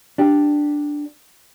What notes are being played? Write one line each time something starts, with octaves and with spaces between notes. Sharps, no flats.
D4 G4